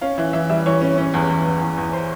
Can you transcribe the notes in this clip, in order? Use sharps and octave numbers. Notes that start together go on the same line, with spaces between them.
C#4 F5
E3 E5
E3 E5
G3 E5
E3 C#5
C#4
C#4
E2
E2
E2
E2
E2
C5